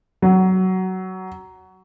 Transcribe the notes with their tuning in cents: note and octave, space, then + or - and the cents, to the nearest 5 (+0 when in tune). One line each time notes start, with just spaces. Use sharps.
F#3 +15